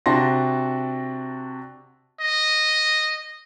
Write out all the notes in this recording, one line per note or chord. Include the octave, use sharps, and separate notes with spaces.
C3 D4 F#4 A5 C6 A#6
D#5